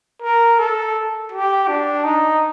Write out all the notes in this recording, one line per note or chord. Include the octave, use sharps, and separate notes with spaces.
A#4
A4
G4
D4
D#4